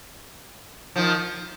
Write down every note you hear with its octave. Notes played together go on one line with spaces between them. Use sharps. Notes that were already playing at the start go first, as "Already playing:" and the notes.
D#3 F3